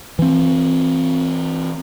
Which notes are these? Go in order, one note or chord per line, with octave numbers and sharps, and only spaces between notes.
E3 C4